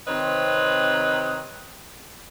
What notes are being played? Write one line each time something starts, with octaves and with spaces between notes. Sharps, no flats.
C3 D#3 C4 B4 C#5 D#5